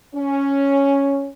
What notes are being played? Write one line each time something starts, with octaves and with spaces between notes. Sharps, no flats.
C#4